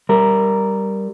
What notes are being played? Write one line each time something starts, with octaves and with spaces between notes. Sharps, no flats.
G3 A#4